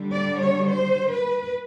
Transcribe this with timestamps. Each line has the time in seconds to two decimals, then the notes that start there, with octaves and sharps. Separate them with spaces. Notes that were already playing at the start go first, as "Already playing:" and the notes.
Already playing: D3 G3
0.12 D5
0.41 C#5
0.70 C5
1.13 B4